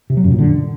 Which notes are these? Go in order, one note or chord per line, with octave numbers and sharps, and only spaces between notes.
C3
F#3
F#2
A#2
D3